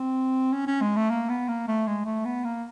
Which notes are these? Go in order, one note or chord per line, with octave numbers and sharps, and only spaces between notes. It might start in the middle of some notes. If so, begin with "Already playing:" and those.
Already playing: C4
C#4
C#4
G#3
A3
A#3
B3
A#3
A3
G#3
A3
B3
A#3